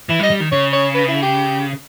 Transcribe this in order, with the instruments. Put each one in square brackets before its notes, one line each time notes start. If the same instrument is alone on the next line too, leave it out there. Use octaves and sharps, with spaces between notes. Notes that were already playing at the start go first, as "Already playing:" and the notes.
[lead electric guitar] E3 [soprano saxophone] E4
[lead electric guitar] G3
[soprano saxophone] D#5
[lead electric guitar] G3
D#3
[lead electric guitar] C#3 [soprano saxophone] C#5
[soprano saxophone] C#5
B4
E4
G4